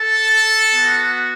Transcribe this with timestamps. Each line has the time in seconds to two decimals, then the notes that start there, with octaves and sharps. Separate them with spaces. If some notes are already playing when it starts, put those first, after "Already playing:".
Already playing: A4 A5
0.73 B3 F#4